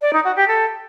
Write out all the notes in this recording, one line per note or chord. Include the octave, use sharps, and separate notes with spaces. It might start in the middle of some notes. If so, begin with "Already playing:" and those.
D5
D#4
F#4
G4
A4